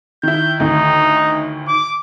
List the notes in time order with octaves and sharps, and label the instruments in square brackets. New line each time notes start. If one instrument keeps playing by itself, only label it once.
[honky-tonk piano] D#3 E4 [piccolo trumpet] G6
[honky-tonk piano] D2 A2 D#3 [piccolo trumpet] D#4
[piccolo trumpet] D6